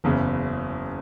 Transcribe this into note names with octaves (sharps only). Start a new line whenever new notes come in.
F#1 E2 C#3